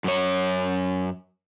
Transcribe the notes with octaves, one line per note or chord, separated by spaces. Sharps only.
F#2 C#5